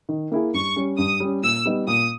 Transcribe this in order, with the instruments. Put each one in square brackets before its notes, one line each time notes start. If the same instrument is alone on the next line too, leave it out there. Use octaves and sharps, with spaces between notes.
[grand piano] D#3
A#3 E4 G#4
[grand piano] G2 [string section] C#6
[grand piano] G3 C#4
[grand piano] G2 [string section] D#6
[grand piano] G3 C#4
[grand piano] A#2 [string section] E6
[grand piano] G3 B3 D#4
[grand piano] A#2 [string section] D#6